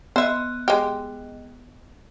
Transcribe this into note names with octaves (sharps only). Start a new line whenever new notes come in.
B3 C5 D#5 E5
G#3 G4